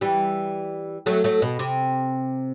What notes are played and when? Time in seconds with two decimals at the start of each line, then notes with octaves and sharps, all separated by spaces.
0.01 E3 G3
1.06 F#3 A3
1.24 F#3 A3
1.42 B2
1.59 C3